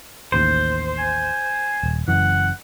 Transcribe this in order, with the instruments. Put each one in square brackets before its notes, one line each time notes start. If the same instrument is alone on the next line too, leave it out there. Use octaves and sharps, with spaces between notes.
[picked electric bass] A1 D#2 [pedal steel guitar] C5
[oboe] G#5
[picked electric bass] D#1
[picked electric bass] F#1 F#2 E3 [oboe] F#5